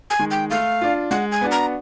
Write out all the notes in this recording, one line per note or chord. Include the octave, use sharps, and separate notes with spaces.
G#5
D#3 G#3
G5
A3 F5
D4 F4
G#3 F#5
G#5
B3 D4 F#4
A#5